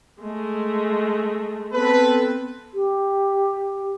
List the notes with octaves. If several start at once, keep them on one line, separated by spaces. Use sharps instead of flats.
G#3 A3
B3 C4 A4 B4
G4